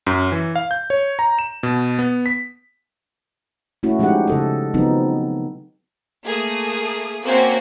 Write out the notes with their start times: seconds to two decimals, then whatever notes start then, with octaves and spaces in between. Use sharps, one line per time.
0.07 F#2
0.32 E3
0.55 F5
0.71 G6
0.90 C#5
1.19 A#5
1.39 E7
1.63 B2
1.99 B3
2.26 B6
3.83 A3 C#4 E4 F#4
3.99 F3 G#3 C#4 D#4 G4 F#5
4.28 C#3 A4 D#5
4.74 C#3 F3 F#3 B3 C4 D#4
6.27 A3 A#3 G#4 D#6
7.26 A#3 C4 C#4 F#4 C5 G#5